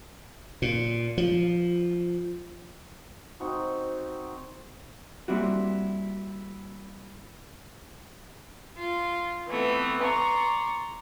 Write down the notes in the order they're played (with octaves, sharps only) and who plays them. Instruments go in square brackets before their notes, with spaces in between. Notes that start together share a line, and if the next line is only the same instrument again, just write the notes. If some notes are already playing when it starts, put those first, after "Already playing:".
[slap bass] A#2
F3
[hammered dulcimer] C4 D#4 F#4
[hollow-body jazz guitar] G3 A#3 C4 E4 F#4
[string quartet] F4
E3 A3 B3 C4
D5 A#5 C6 C#6